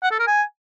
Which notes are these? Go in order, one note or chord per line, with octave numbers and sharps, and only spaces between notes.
F#5
A4
A#4
G#5